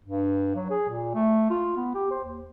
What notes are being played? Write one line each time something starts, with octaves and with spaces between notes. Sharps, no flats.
G2
F#3
G#4
A#2
A3
F4
B3
G4
C5
D#2